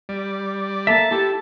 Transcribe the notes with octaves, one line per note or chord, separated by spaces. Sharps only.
G3 D5
A#3 A4 E5 A5
E4 G4 A4